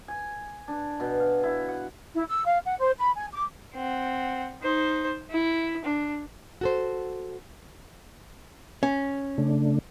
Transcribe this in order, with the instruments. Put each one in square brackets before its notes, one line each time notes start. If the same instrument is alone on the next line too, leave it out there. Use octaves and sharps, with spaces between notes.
[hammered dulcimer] G#5
D4
B2
F5
E4
F#5
[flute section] E4
E6
F5
F#5
C5
B5
G#5
D6
[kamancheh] C4 F#5
D#4 C5
E4
D4
[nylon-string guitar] F#4 A4 C5
[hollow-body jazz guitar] C#4
[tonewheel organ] C#3 A3 D4